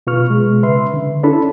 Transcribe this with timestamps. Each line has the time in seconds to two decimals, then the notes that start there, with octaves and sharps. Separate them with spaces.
0.07 B2 F4 B4 C#6 F6
0.30 B2 G#3
0.63 C#3 B4 E5 C6
0.94 D3
1.23 C#4 D4 E4 A4 B5